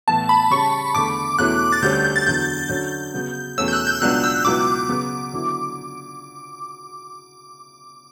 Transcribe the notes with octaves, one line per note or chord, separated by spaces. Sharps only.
A2 E3 B3 A5
B5
C#3 G3 C#4 C#6
E2 D3 A3 D6
E2 B2 A3 C#4 E4 F#6
A6
D2 D3 G3 C#4 G6
G6
G6
A6
E2 D3 F#3 G6
D3 F#3 C#4
C#3 F#3 B3
E2 B2 A3 C#4 E6
G6
F#6
G6
C#2 B2 F#3 B3 D4 F#6
E6
C#2 B2 F#3 B3 E4 D6
C#3 F#3 B3 F#4
D3 F#3 B3 E4